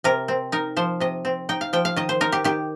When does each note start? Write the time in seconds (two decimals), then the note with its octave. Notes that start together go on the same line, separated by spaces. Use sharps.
0.04 C3 A#4
0.28 C4
0.52 D#4 A#4
0.77 F3 C5
1.00 C3 D#5
1.25 C4
1.49 D#4 G5
1.61 F5
1.73 F3 G5
1.85 F5
1.96 D#3 D#5
2.09 C5
2.21 D#4 A#4
2.32 G4
2.44 D#3 G4